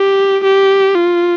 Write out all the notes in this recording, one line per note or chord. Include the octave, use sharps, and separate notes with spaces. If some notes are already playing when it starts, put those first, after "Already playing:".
Already playing: G4
G4
F4